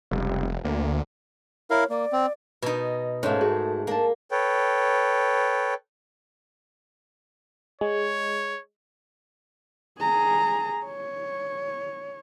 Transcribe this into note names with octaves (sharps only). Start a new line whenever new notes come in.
F1 C#2 C3 G3
D2 A#3
E4 A#4 C#5 F5
A#3 D5
C4
B2 D#4
G#2 A3 C#4 F5
F#4 G#4 A#4
A#3 D4 A5
A4 B4 C#5 G5
G#3 C#5
G#4 A#5
C#5